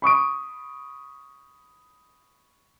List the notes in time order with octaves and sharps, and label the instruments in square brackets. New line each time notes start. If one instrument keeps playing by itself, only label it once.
[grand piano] B5 C#6 D#6 D7